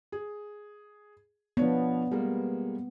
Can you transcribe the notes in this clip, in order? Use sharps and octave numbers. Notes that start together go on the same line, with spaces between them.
G#4
F3 B3 D4 C#5
G3 G#3 A#3